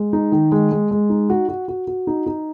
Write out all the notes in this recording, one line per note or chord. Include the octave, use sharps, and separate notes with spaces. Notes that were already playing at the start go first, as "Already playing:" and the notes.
Already playing: G#3
D#4
D#3
G#3
G#3
G#3
D#4
F#4
F#4
F#4
F#4
D#4
D#4